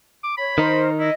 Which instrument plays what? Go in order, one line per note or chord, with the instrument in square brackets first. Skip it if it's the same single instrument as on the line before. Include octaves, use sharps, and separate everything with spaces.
[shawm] D6
[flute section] C#5 [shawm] B5
[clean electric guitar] D#3 D#4 [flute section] A#4 C5
[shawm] E4 [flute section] D#5